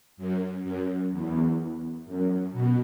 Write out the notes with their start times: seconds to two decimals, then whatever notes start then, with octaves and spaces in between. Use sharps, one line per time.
0.17 F#2
0.64 F#2
1.11 E2
2.06 F#2
2.52 B2